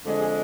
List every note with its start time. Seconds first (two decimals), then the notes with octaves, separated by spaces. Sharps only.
0.05 F2 D3 G#3
0.21 G#4